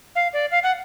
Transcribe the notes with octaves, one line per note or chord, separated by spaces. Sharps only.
F5
D5
F5
F#5